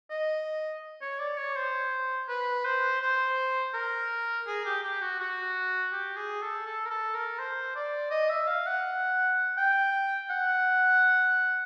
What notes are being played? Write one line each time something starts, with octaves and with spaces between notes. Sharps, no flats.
D#5
C#5
D5
C#5
C5
B4
C5
C5
A#4
G#4
G4
G4
F#4
F#4
G4
G#4
A4
A4
A#4
A4
A#4
C5
D5
D#5
E5
F5
F#5
G5
F#5